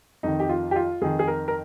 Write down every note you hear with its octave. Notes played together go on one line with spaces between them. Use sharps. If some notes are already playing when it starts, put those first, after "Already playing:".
F2 D#3 D#4
G4
F4
G4
F4
F2 D#3 G#4
G#4
A#4
A#4